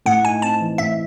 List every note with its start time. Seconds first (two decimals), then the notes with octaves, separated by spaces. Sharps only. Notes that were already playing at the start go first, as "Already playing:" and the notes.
0.06 A2 F#5
0.25 D#4 G#5
0.42 C4 A5
0.60 E3
0.78 A2 E5